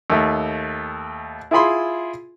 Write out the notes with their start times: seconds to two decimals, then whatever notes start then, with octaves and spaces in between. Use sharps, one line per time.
0.10 D#2 A3
1.51 E4 F4 G#4 B5 C6